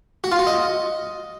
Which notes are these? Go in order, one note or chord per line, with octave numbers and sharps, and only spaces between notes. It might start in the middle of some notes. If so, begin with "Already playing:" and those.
F#4
F4
F#4
D#5